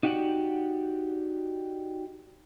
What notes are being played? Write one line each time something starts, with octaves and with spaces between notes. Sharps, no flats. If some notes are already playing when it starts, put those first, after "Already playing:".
D#4 F#4 G4 D5 F#5